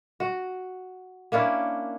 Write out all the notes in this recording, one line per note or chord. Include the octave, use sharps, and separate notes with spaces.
F#4
A#3 C#4 D4 E4